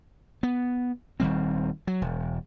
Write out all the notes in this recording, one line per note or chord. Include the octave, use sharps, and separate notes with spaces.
B3
D#1 D#3 G3 C4
F#3
E1